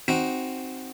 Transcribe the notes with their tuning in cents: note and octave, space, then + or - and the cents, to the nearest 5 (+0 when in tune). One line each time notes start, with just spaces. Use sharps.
C4 +0 D#4 +0 F#4 +0